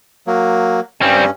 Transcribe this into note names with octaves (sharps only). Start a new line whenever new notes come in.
F#3 A#3
G2 G3 C4 C#4